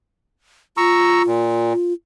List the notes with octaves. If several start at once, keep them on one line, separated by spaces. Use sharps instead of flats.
F4 A#5 C#6 E6
A#2